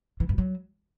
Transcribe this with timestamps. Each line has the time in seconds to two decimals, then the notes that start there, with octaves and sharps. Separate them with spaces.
0.20 E3
0.29 G2
0.38 F#3